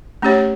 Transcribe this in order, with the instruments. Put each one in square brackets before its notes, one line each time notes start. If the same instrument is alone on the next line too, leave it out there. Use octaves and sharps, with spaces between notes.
[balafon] A3 C#4 G4 C#5